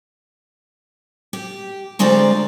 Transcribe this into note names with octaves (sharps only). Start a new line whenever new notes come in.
G4
D2 G#3 C4 F4 D5 A#5